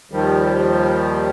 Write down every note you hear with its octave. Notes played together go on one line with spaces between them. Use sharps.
D#2 D#3 F3 G3